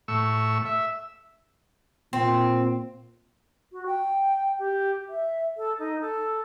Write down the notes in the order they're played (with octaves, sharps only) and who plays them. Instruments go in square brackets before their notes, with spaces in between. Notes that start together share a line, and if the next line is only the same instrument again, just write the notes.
[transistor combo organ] A2 C#6 E6
E5
[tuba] A#2 [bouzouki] C4
[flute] F#4
G5
G4
E5
A4
D#4
A4